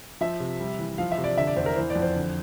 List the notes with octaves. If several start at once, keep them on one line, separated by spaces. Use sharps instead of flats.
F3 E5
C3
G3
E3
F3 F5
E5
C3
D5
D3 E5
D5
E2 C5
A#4
E3 C5
D5
F2
C5
D3